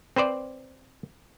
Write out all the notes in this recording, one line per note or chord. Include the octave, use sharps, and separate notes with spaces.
C4 B4 C5 D5